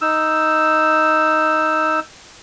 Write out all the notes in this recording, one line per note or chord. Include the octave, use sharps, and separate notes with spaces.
D#4 E6